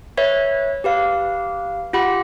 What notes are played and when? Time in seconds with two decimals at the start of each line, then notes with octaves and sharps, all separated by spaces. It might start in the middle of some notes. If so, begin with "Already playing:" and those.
0.17 B4 C#5 E5
0.84 G4 B4 F5
1.93 F4 G4 F#5 B5